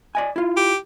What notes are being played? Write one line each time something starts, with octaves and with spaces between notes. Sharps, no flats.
D5 D#5 G#5
E4 F4
G4